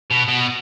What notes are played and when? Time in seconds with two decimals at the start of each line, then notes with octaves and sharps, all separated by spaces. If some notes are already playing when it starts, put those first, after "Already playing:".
0.11 B2
0.28 B2